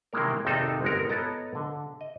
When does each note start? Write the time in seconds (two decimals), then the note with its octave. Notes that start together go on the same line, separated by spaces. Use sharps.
0.13 C3 D#3 E3 G#3 A#3 A#4
0.45 G#1 F2 C3 C4 D#4 A4
0.82 G1 G#3 F#4 A#4
1.09 B3 A4 C#5 D#5 A5 A#5
1.55 D3
2.01 D#5